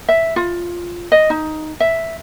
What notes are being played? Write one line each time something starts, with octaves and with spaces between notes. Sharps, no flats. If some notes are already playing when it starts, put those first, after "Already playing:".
E5
F4
D#5
D#4
E5